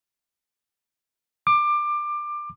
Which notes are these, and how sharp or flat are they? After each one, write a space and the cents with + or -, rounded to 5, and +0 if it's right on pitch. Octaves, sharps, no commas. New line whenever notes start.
D6 +20